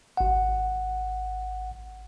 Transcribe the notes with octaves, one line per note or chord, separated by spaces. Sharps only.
G#1 F#5